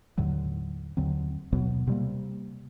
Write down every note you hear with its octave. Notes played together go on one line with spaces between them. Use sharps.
D#2 A2 D3 F#3
D#2 D3 F#3 C4
D#2 B2 F#3 B3
C3 G3 A#3